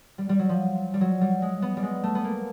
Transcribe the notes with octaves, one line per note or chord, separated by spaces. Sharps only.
G3
G3
F#3
F3
G3
F#3
G3
G#3
B3
G3
G#3
A3
B3
A#3